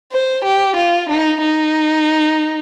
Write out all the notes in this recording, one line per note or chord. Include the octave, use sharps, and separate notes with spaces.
C5
G4
F4
D#4
D#4